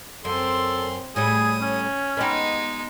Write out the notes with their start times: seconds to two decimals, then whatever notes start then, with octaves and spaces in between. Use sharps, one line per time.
0.25 F#2 C4 A4 C6
1.16 A2 G3 A3 G#4 D#6
1.62 C#4
2.17 G#3 B3 D#4 G4